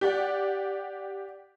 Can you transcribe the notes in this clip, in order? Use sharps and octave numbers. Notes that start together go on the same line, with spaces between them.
G4 D5 F#5